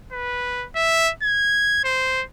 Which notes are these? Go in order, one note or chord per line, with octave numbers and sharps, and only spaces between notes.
B4
E5
G#6
C5